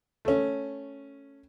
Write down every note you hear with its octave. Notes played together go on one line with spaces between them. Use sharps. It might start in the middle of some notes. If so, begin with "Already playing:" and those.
A3 C#4